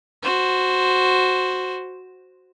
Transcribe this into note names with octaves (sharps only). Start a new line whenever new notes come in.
F#4 C5